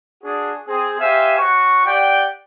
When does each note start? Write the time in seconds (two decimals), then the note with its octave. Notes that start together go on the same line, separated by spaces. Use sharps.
0.23 D4 F#4 G#4
0.68 C4 G#4
1.00 G4 C5 E5 F5 G#5
1.39 F#4 C#5 C#6
1.85 G4 D5 F#5 G5